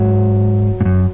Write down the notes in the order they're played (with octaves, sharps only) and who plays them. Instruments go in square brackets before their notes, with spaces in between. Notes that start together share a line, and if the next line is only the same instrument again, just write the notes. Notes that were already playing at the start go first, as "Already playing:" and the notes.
Already playing: [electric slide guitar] G#2 [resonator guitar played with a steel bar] F#3
[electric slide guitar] G#2
F#2